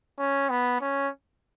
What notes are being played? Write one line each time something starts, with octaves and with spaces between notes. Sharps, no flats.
C#4
B3
C#4